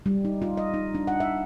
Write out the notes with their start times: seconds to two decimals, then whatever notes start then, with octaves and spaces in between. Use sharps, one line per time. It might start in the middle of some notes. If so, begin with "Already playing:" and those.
0.06 G3
0.25 D#4
0.42 F4
0.57 D#5
0.74 D#4
0.95 D4
1.07 F#5
1.20 E5